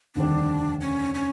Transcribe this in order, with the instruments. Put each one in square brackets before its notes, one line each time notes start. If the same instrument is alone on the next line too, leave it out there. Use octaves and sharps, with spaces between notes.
[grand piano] F1 D#2 D3 G3 C4 [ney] D4
[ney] C#4
C#4